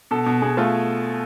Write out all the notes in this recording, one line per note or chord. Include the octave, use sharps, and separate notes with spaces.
B2 A4
B2
B2 G#4
A3 F4